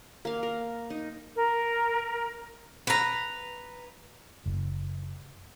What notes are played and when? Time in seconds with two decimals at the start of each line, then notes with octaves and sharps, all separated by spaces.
0.25 A#3 F5
0.43 A#4
0.90 D#4
1.36 A#4
2.87 B4 A#5
4.46 F#1